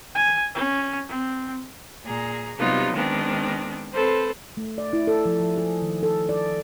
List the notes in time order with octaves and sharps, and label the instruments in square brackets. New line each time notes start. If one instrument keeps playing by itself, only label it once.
[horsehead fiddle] G#5
C#4
C4
[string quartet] A#2 G#4 A#5
C3 F#3 G3 B3 D#4 F4
D#3 G#3 B3 C4 D4
C4 A4 B4 C5
[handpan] A3
D5
E4
A4
F3
F3
G#4
D#3
A4
D5